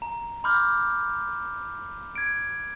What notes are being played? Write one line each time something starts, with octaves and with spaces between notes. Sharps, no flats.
A#5
B5 C6 D6 F6 G6
G#6 D7